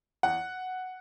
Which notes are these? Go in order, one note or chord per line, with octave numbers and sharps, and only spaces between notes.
E2 F#5